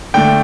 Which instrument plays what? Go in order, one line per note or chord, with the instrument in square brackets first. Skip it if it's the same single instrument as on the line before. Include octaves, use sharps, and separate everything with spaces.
[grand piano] D3 A3 G5